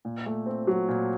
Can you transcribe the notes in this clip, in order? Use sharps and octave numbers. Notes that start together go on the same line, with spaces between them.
A#2
A3
C4
F#3
A#2